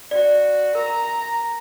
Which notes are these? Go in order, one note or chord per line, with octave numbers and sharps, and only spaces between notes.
F#4 D5
A#4 A#5